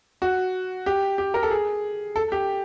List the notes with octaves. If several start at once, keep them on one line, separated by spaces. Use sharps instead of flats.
F#4
G4
G4
A#4
A4
G#4
A4
G4